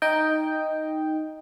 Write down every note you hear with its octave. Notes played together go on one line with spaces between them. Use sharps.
D#4 D#5 G5